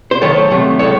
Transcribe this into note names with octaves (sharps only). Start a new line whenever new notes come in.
C5
D#3 F#3 A3 A4 C#5
C3 F#3 A3
A2 G#3 A4 C#5